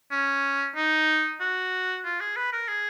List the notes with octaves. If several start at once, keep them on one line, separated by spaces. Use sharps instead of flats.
C#4
D#4
F#4
F4
G#4
B4
A#4
G#4